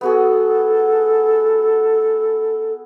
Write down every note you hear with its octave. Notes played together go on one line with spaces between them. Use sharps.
B3 F#4 G#4 A4